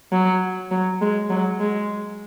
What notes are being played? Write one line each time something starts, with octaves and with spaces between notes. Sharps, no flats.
F#3
F#3
G#3
F#3
G#3